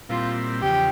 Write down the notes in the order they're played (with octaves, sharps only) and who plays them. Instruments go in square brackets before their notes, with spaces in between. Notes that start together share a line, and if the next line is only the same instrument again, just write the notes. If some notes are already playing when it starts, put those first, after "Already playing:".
[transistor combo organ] A#2 G3 C4 E4 [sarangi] F4
[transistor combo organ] E2 C#3 F3 [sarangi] G4